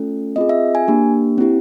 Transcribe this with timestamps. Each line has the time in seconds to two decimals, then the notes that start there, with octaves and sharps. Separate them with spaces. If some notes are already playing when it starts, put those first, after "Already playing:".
Already playing: A3 C#4 F4 A4
0.36 C4 F4 G#4 D#5
0.49 E5
0.75 G#5
0.88 A#3 D4 G4
1.38 C4 E4 G4